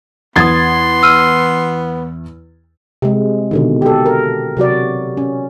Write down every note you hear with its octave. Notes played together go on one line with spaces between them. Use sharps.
E2 B3 F#5 C6 D#6 G#6 A6
E6 F6 D#7
C3 G#3
B2 D3 D#3
G4 A4
A#4
C3 F#3 F#4 D5
C#4